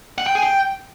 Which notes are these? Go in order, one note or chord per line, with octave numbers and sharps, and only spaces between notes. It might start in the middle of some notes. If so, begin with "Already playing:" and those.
F#5
G5
G#4
G5